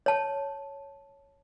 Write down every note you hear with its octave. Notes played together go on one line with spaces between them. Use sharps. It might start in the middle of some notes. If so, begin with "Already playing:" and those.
C#5 A5